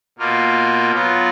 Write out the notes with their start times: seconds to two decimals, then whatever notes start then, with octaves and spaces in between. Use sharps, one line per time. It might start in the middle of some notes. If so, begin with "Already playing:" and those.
0.18 B2 A#3 F4
0.92 F#3 B3 F4